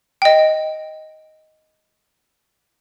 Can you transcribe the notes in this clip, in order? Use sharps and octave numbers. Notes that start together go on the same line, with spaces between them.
D#5 G5